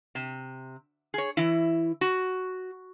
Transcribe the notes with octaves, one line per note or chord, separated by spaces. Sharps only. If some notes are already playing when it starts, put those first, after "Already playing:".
C3
G#4 C#5
E3 E4
F#4